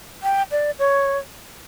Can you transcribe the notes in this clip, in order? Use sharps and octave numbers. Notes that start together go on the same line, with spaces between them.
G5
D5
C#5